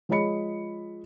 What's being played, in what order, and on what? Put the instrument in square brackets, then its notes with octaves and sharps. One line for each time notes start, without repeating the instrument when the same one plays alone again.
[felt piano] F3 G#3 C#5 D#5 B5 C#7